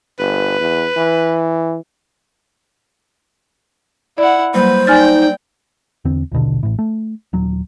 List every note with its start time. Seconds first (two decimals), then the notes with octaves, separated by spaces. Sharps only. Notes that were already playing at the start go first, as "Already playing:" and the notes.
0.19 G1 B4
0.60 E2
0.97 E3
4.18 E4 D5 F#5
4.54 F#3 G3 A#3 B4 C5
4.87 D#4 D5 G5 G#5 F6 A6
6.05 E2 D3 C4
6.31 A#1 D#2 B2 D3
6.63 A1 A2
6.79 A3
7.33 D#1 F#3